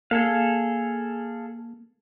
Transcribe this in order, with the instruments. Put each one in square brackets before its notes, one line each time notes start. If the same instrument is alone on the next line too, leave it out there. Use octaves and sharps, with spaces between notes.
[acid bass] A#3 [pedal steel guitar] G#4 A4 F5